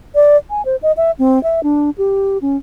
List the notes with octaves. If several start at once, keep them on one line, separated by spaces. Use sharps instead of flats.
D5
G#5
C5
D#5
E5
C4
E5
D4
G4
C#4